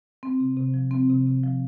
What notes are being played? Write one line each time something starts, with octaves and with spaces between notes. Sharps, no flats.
C4
C3
C3
F3
C4
C3
C3
F3